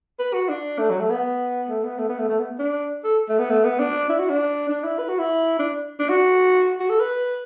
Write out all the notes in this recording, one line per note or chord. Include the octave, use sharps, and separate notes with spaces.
B4
F#4
D4
A3
F#3
A3
B3
A3
B3
A3
B3
A3
A3
B3
D4
A4
A3
B3
A3
B3
D4
E4
F#4
D4
D4
E4
B4
F#4
E4
D4
D4
F#4
F#4
A4
B4